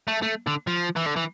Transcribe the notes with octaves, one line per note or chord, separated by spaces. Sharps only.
A3
A3
D3
F3
E3
D3
E3